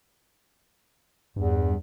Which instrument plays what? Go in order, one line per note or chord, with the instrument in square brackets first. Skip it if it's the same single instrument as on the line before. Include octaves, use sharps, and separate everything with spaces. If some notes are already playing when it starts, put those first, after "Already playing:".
[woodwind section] E2 [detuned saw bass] G2